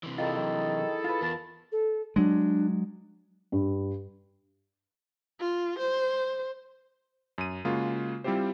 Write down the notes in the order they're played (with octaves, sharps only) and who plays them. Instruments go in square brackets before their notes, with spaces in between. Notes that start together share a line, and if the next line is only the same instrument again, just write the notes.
[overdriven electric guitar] C3 E3
[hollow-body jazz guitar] C2 F4 [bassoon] D#3 [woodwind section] E4 G#4 A4
[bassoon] D#3 [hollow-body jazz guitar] F#3
[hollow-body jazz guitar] F4 B4
[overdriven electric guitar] E2 [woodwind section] A#4 A5
[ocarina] A4
[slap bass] F#3 G#3 [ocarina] D4
[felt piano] G2
[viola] F4
C5
[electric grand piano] F#2 D#7
C#3 G#3 A#3 F4 F#4
G3 C4 E4 F4 G4 C5